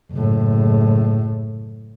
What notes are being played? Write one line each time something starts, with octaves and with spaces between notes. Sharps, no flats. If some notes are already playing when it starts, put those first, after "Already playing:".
F#1 A2